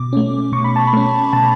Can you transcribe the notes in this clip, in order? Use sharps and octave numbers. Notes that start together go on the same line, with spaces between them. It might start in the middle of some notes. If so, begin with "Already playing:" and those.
Already playing: B2 D6
A3 C#4
B2 C#6
B5
A5
B5
A3 C#4
B2 A5